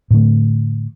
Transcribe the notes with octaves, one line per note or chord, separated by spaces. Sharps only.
A2 D3 A3